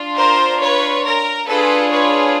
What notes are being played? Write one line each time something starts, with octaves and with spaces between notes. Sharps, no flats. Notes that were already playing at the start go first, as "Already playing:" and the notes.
Already playing: D4 F4
A#4 C5
B4 C#5
A#4
D4 F4 G#4 A4 B4
B4 C#5